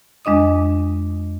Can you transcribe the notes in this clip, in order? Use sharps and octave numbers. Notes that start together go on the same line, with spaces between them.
F2 G#3 D4 D#5 D#6